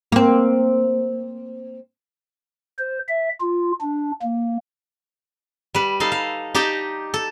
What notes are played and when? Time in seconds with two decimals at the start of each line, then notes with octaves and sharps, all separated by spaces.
0.12 A#3 C4
2.79 C5
3.09 E5
3.41 F4
3.81 D4
4.22 A#3
5.75 G3 B4
6.00 D#4 A4 F5
6.12 F5
6.54 D#4 G4 D5 G5 A5 A#5
7.14 A4